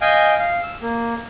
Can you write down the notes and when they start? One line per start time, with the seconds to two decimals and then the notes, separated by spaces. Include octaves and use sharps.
0.01 D#5 F5 G5 G#5
0.39 F5
0.63 E6
0.82 A#3